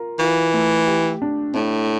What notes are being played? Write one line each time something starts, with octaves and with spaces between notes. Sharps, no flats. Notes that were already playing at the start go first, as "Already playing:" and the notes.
Already playing: F4 A#4
E3 F4
A3
G4
D4
A2 D4